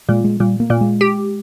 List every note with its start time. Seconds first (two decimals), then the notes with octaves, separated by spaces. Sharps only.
0.09 A#2 G#3
0.24 G#3
0.40 A#2 G3
0.60 A#3
0.70 A#2
0.81 G#3
1.01 G4